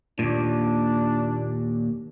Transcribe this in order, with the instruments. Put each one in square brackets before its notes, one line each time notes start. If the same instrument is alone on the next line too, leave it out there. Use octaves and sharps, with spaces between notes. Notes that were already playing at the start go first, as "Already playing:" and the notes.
[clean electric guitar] D#2 A#2 [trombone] D4